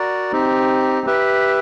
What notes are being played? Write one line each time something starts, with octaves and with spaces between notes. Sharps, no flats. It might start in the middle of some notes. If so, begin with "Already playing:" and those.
Already playing: F#4 A#4 D5
C4 D#4 G4
G4 B4 E5